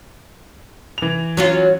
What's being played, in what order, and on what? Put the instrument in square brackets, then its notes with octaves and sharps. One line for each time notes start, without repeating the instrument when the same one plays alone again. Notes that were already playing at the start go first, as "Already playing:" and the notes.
[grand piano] E3 F7
[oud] F#3 C#4 F4